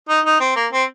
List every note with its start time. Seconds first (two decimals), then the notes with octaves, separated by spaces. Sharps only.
0.09 D#4
0.25 D#4
0.40 C4
0.56 A#3
0.72 C4